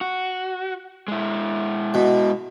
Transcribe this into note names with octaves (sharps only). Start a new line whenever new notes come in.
F#4
G#3 E4
B2